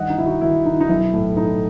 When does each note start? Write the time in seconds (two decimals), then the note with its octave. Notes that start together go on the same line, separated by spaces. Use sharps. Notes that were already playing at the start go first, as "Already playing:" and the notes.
Already playing: G2 D#3 D#5 F#5
0.10 D#4
0.18 D#3 E4
0.26 D#4 F#4
0.41 D#3 E4
0.66 D#3 D#4
0.81 D#4
0.89 B1 E4
1.14 A2
1.36 A2 D#4